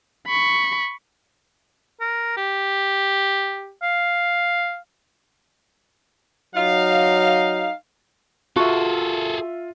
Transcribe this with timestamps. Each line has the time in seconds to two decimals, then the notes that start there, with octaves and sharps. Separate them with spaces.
0.27 B5 C#6
2.01 A#4
2.37 G4
3.83 F5
6.55 F#3 D#4 F5
8.56 F4 F#4 G#4 A4 E5